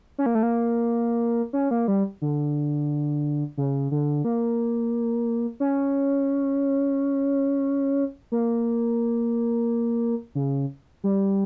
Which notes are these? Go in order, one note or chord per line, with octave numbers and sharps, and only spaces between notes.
C#4
A#3
A3
A#3
C#4
A#3
G3
D3
C#3
D3
A#3
C#4
A#3
C#3
G3